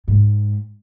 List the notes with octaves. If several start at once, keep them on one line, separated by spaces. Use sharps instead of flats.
G#2